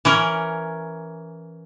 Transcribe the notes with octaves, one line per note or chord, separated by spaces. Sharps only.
E3 C#4 A#4